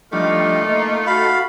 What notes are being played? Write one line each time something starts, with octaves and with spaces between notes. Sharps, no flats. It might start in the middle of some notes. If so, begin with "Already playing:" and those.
F3 G3 A3 D4 D#4 F4 D#5
A#3 D6
F#4 A4 F5 B5